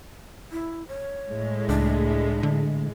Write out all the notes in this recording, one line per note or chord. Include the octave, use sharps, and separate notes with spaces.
E4
C#5
A2 G#3
C#2 D4
D3